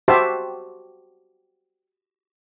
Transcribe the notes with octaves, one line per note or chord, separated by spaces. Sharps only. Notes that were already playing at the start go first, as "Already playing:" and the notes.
F#4 G4 C5 E5 A5 C6